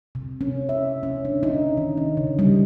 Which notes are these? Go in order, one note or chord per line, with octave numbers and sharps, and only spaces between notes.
C3
C#4
E5
C#4
D4
D#4
D#3
C#4
C#3
G3